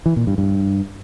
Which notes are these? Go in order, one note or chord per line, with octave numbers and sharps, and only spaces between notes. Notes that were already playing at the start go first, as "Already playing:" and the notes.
E3
A#2
G2
G2